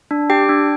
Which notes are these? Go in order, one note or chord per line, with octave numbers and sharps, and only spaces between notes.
D4
G4 G5
D4